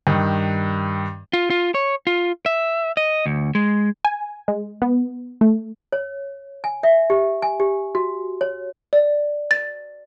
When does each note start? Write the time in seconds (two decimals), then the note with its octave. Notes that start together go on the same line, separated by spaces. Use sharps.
0.07 G2 D#3
1.33 F4
1.50 F4
1.75 C#5
2.07 F4
2.46 E5
2.97 D#5
3.26 D2
3.55 G#3
4.05 G#5
4.48 G#3
4.82 B3
5.41 A3
5.92 C#5
6.64 G#5
6.83 E5
7.10 G4
7.42 G#5
7.60 G4
7.95 F#4
8.41 C#5
8.93 D5
9.51 A6